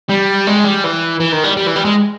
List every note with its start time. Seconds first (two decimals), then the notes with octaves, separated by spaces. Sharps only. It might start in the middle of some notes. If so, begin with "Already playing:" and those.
0.09 G3
0.47 G#3
0.64 G3
0.84 E3
1.20 E3
1.32 D#3
1.44 G3
1.57 G3
1.67 E3
1.76 G3
1.85 G#3